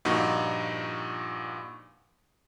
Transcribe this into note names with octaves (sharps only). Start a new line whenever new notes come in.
G2 A#2 F3 D#4 F#4